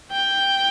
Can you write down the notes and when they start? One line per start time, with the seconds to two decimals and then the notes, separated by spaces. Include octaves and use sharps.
0.11 G5